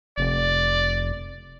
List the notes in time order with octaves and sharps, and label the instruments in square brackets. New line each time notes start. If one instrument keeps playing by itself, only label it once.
[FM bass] F1 [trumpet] D5